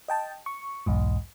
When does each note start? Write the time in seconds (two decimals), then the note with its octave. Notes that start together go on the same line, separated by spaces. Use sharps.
0.08 D#5 G5 A5
0.46 C#6
0.86 B1 E2 G#2